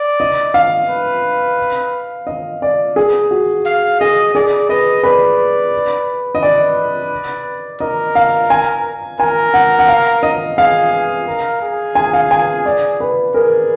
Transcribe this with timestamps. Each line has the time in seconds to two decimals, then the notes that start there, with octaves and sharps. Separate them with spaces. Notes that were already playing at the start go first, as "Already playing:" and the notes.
Already playing: D5
0.20 D#5
0.54 F5
0.89 B4
2.27 D#5
2.62 D5
2.96 G#4
3.31 F#4
3.65 F5
4.00 G#4 D#5
4.35 G#4 D5
4.69 B4 D#5
5.03 B4 D5
6.35 D#5
6.42 B4 D5
7.80 A#4 D#5
8.15 F5
8.50 G#5
9.19 A#4 G#5
9.54 F#5
9.79 F#5
9.88 F5
10.23 D#5
10.57 G#4 F5
10.92 G#4
11.27 A#4
11.62 G#4
11.95 G#5
12.13 F5
12.31 G#5
12.66 D5
13.00 B4
13.34 G#4 A#4